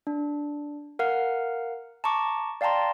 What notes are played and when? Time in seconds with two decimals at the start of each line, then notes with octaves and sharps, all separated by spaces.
0.07 D4
0.99 A#4 F5 F#5 F6
2.04 A5 A#5 C#6 D6
2.61 D5 F5 G5 A5 A#5 C6